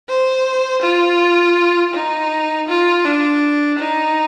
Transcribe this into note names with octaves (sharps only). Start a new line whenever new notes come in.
C5
F4
D#4
F4
D4
D#4